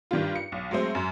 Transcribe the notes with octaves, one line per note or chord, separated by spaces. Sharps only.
G2 D#3 G3 F4
C#7
B1
F#3 G#3 A3 C4
F#2